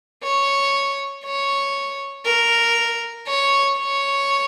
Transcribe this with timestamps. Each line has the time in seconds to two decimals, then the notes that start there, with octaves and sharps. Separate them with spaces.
0.23 C#5
1.25 C#5
2.26 A#4
3.27 C#5
3.78 C#5